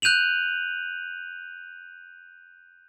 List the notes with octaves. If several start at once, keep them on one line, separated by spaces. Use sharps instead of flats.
F#6 G6 D#7 F7 F#7